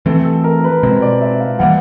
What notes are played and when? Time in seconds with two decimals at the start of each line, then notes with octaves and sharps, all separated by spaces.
0.06 E3 A3 C4 A4
0.25 A4
0.44 A#4
0.64 B4
0.83 B2 G#3 C4 C5
1.02 D5
1.21 E5
1.40 F5
1.59 E3 G3 A#3 F#5